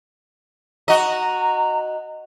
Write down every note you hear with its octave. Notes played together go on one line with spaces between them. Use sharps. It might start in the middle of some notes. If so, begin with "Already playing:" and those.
F#4 D#5 A#5